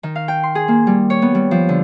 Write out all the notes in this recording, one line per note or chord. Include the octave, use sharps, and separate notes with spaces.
D#3
F5
G5
C6
G#4
A#3
G3
C#5
B3
G3
F3
D3